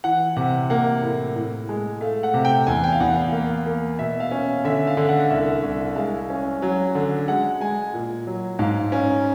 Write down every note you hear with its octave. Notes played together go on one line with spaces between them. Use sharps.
E3 F#5
C3 F#5
A#3 F#5
A2
A2
G#3
A3 F5
F#5
C3
G5
E2 G#5
G5
F5
E2 F#5
F5
A#3 F5
A#3
B2 E5
F5
C#4
D3 E5
F5
D3
F#5
C2 E5
C2
E5
G#3 F5
C#4
F#3
D3
G#3 F#5
G#3 G#5
A#2
F#3
G#2 F5
C#4